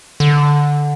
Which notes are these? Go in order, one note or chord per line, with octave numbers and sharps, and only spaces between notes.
D3